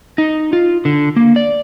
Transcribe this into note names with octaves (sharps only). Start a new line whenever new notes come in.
D#4
F4
D3
A#3
D5